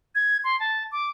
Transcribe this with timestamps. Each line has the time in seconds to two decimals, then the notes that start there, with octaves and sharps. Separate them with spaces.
0.15 G#6
0.44 C6
0.60 A5
0.92 D6